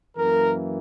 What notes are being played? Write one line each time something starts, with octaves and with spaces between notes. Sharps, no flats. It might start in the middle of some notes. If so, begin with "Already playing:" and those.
F#2 E3 A#3 A#4